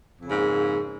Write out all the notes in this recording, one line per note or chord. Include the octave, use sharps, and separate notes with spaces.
F2 G#2 C#3 A#3